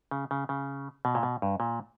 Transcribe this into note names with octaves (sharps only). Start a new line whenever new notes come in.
C#3
C#3
C#3
B2
A#2
B2
G2
A#2